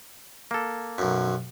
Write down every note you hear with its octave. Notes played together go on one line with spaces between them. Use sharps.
A#3 A4
B1 F#2